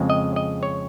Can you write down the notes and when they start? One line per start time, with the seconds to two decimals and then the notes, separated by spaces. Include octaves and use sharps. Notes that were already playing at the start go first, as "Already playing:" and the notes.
Already playing: F2 C#3 G#3 C4
0.10 D#5
0.36 D#5
0.63 C#5